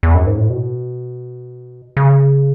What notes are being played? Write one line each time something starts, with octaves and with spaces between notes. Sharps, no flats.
E2
F#2
G#2
A2
B2
C#3